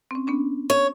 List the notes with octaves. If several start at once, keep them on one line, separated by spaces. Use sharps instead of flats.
C4 C#4
B3 C#4 D4
C#5